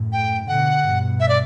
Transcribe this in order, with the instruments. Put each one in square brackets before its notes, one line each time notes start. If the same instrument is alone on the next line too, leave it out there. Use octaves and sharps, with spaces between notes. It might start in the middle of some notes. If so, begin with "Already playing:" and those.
Already playing: [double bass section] F#2 A2
[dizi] G5
[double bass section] B2 D3 [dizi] F#5
[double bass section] G2 B2
[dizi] E5
D5